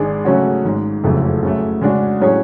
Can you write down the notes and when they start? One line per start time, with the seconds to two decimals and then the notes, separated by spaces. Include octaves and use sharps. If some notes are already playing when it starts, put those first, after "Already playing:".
Already playing: G#1 G#2 G#3 D4 G#4
0.25 C#3 F#3 A3 C#4 F#4
0.64 G#1 G#2 G#3
1.04 F#1 F2 C#3 F#3 A3
1.43 C#3 F#3 A3
1.81 C#3 G#3 D4 F#4
2.21 A2 F#3 C#4 G#4 C#5